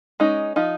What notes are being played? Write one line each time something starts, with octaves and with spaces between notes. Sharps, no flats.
G#3 C#4 D#4
F3 D#4